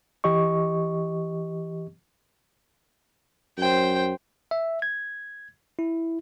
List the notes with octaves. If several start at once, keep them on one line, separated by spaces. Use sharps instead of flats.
E3 G4 D#5 C#6
F#2 C5 G5
E5
G#6
E4